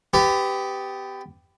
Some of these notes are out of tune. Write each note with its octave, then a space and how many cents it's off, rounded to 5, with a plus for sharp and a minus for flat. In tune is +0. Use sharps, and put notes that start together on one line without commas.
B3 +25 G4 +0